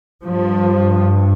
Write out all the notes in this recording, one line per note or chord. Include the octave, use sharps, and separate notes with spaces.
G2 F3